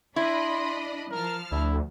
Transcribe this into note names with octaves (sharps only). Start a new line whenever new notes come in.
D4 E4 D#5 B5 C6
F3 A#4 A5 F6
D2 E4